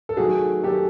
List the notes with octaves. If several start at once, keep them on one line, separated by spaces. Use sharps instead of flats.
A4
D#3 F#3 A3 F#4 G#4
D#3 F#3 A3 G4 A4